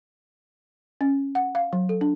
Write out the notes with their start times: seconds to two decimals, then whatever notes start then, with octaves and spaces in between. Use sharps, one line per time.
1.01 C#4
1.35 F#5
1.55 F5
1.73 F#3
1.89 A4
2.01 D4